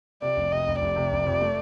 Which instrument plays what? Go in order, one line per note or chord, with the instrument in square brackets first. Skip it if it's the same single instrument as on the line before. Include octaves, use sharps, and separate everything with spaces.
[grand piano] C3 [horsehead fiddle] D5
[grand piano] F1
[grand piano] C3 [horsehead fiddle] D#5
[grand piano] F1
[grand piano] F1 [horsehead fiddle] D5
[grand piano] C3
F1
F2
A3